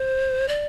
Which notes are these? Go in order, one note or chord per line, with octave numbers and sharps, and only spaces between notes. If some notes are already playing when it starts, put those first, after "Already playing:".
Already playing: C5
D5